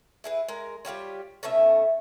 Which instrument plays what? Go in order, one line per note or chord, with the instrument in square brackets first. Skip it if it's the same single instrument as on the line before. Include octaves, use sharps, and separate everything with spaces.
[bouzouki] E4 G#4 B4
G#3 A#4
G3 F4 G4 C#5
B2 A3 C#4 E5